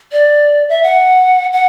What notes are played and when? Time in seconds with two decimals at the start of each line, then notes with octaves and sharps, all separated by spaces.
0.12 D5
0.69 E5
0.83 F#5
1.53 F#5